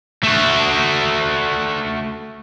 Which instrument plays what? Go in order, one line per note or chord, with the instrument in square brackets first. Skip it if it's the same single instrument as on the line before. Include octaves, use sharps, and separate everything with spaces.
[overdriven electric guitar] A3 F#4